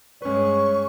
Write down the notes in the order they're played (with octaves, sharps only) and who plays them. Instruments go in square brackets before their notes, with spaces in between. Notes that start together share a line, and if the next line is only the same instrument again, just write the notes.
[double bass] G2 G#3 [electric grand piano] C#4 B4 [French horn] C#5 [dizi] C#6